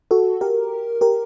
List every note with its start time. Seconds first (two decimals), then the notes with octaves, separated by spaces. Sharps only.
0.11 F#4 A4
0.41 G4 A#4
1.01 G4 A#4